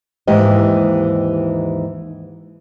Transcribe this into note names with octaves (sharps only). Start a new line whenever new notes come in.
D#2 G#2 E3 G4 D#5